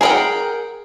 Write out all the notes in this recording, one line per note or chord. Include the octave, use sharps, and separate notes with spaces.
G#4 A#4 B4 F#5 G5